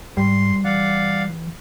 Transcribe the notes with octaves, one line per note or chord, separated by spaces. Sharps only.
G#2 G3 C6
E3 D5 F5 F#5